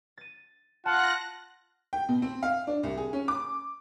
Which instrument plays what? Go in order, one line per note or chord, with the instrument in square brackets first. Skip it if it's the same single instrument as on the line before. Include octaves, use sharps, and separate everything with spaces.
[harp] A6 D#7
[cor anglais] F4 [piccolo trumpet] F#5 [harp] A5 [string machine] F#6 A#6
[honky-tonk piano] G5
B2
C4
F5
D4
C2
G#4
C#4
D6